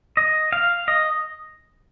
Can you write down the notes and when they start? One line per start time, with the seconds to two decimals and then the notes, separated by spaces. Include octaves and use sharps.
0.17 D#5
0.52 F5
0.88 D#5